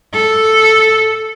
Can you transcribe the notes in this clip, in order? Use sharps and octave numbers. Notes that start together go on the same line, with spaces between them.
A4